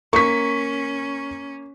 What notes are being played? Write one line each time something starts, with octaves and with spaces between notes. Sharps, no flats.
A#3 C#4 C#6 B6